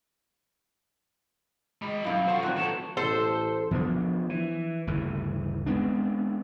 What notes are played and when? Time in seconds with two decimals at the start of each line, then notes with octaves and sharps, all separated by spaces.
1.82 G#3 D#5 B5
2.04 F#2 B2 D#4 E4 F5
2.27 F3 F#3 F#4 A4 C5
2.43 A#2 D#3 C4 F#6
2.57 E3 F#3 A3 B3 A4 E7
2.97 A1 A4 C5
3.71 F3 B3 C#4 D4
4.30 E3
4.87 G1 D2 C#3 E3
5.66 G#3 B3 C4 D4